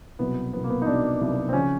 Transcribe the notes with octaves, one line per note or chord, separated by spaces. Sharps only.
C2 B2 F#3 B3
C2 B2 F#3 B3
A#3
B3
D#4
C2 B2 F#3 D4
C2 B2 F#3
C4
C#3 F3 C#4